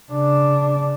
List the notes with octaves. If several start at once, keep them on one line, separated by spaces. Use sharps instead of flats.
C#3 D4